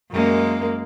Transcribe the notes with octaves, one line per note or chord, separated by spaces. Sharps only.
F#2 G#3 A#3